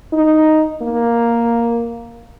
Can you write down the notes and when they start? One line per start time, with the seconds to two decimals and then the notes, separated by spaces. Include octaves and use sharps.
0.13 D#4
0.82 A#3